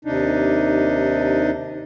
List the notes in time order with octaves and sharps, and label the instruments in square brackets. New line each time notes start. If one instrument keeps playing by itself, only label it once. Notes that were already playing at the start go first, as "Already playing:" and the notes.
[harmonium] D#2 C3 D4 D#4